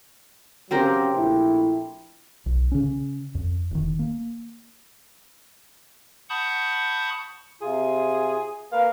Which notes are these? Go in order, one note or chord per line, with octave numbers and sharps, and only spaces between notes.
C#3 F#3 C4 G4 A#4 C5
A#1 A3 E4
B1
C#3 C#4
F2
E1 D#3
A#3
F#5 A5 B5 C#6 D#6 G6
C3 F4 G#4
A#3 A#4 B4 F5